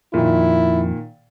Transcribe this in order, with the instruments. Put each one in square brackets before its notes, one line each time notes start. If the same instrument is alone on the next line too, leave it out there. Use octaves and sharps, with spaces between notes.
[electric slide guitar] F2 [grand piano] A#2 D#3 [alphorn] E4